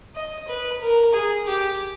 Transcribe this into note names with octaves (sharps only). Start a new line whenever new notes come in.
D#5
B4
A#4
G#4
G4